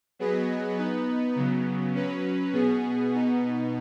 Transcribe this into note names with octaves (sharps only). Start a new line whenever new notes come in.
F#3 B3 G#4 B4 D#5
B3 D#4 B4
C#3 F#3 B3
F#3 C#4 B4
B2 B3 G#4
B2 B3 D#4